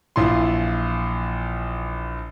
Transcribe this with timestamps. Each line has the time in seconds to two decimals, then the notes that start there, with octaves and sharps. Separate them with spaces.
0.16 A#1 E3 E4 F4 C6